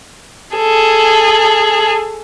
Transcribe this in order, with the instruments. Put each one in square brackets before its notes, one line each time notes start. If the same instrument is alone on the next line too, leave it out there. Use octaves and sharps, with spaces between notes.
[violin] G#4 A4